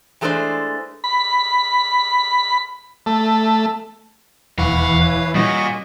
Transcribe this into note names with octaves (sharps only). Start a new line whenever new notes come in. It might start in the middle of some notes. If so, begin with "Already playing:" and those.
E3 G#3 A3 C#4 D4 C5
B5
A3
E1 D#2 E3 F5 F#5 B5 C#6
B4 C#5
A#2 G3 C#4 F#4 D#5